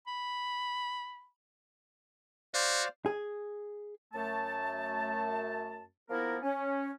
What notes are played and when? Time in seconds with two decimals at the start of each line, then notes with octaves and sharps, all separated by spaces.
0.07 B5
2.54 F#4 C5 D5 F5
3.06 G#4
4.13 F#2 A3 A5
6.09 F3 A#3 B3 E4 A#4
6.42 C#4